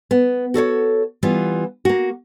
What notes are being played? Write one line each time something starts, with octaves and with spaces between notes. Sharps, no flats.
B3
F#4 A4 C5 C#5
E3 G3 B3 F4
A#3 F#4